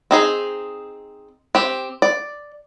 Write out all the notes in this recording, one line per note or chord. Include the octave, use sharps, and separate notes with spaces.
C4 D#4 G#4
C4 G4
D5